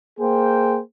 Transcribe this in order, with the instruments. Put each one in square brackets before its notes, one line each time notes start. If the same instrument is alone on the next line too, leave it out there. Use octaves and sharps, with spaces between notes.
[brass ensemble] A#3 G#4 C5 G5